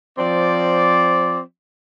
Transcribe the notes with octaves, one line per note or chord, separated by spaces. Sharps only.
F3 C4 D5